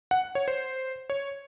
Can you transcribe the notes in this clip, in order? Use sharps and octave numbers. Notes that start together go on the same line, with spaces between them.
F#5
C#5
C5
C#5